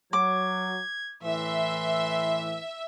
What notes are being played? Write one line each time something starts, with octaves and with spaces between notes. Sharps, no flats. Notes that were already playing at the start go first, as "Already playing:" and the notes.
F#3 D6 G#6
A2 E3 E5 C6